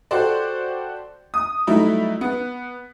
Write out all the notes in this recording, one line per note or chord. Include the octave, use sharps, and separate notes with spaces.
F#4 G4 A4 C5 D5
D#6
F#3 G3 A3 D#4 E4 E5
B3